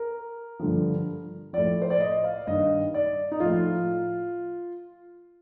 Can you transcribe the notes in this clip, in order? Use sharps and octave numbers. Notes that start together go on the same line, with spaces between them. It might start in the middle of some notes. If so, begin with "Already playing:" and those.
Already playing: A#4
G2 D3 F3
A2 F3 D5
C5
D5
D#5
F5
G2 D#3 D#5
D5
D#4
A2 F3 F4